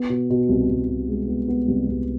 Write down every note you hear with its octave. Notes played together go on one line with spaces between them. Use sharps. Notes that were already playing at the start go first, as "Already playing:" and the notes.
Already playing: B3
B2
B2
C2
C2
B2
G#3
B3
B3
C2
C2